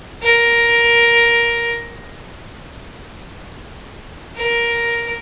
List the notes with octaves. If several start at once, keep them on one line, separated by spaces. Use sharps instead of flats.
A#4
A#4